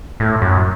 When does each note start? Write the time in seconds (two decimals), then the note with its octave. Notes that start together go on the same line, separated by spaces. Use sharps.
0.20 A2
0.42 F#2